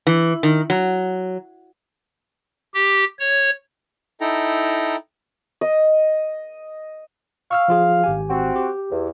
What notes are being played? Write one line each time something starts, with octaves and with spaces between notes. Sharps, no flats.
E3
D#3
F#3
G4
C#5
D#4 E4 A4 G5 A#5
D#5
F5 C#6 E6 F6
F3 F4 G#4
G#1 G4 G#5
C4 F#4
G4
E2